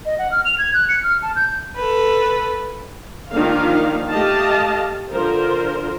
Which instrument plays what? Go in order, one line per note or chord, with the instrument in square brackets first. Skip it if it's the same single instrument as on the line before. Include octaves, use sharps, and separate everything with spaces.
[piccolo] D#5
F#5
F6
F7
G#6
F#6
C#7
F6
A5
G6
[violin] A4 B4
[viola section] D#3 F3 A#3 D4 F5
A3 G4 D#5 F5 A5
D3 F3 F4 A#4 C5